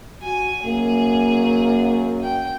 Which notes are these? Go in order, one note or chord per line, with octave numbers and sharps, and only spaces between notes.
F#4 G#5
F#2 A#3 G#4
G5